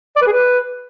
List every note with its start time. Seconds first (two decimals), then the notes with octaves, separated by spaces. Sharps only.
0.16 D5
0.21 B4
0.27 G#4
0.32 B4